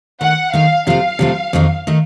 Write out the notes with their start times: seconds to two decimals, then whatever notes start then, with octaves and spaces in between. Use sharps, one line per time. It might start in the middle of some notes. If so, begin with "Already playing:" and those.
0.21 D#3 A3 D#4 F#5
0.53 D#3 A3 D#4 F5
0.87 C3 F3 A3 F5
1.19 C3 F3 A3
1.53 F2 D#3 A3 D#4
1.87 D#3 A3 D#4